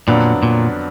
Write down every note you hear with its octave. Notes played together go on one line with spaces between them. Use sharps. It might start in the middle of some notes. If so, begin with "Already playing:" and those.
F2 A#2 D3 F#3 B3 D4
A#2